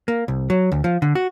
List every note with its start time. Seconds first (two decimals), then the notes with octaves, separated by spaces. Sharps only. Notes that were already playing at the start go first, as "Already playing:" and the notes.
0.08 A#3
0.28 C2
0.50 F#3
0.72 D2
0.84 F3
1.02 D3
1.15 F#4